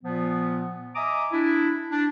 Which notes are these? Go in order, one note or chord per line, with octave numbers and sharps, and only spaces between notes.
A#2 F3 B3
D#5 E5 G#5 A#5 D6 D#6
D4 E4
D4